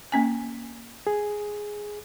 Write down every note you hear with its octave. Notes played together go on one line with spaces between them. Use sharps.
A#3 C#4 G#5
G#4